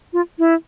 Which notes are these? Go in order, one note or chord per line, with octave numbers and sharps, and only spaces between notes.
F4
E4